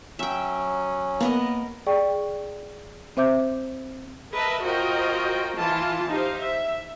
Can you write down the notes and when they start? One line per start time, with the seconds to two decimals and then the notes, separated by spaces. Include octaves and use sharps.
0.19 F#3 C#4 E5 G5
1.20 A#3 B3 A#4 D#5
1.86 G#4 D5 G5 C#6
3.17 C4 C5 E5 D6 G6
4.32 A#4 B4 D#5 E5 A5
4.62 F4 F#4 A#4 C5 D#5 G5
5.56 E3 F4 A5
6.08 D#4 G4 C5 F5
6.39 E5